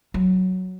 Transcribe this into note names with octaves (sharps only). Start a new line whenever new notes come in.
F#3